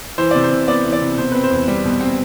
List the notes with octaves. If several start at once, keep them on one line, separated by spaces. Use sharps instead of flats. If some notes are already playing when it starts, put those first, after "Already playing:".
E3 C5
C3 D5
C5
C3
B3 D5
E3
D5
C3
B2 C5
C4 B4
C5
E2
G3
B2
C4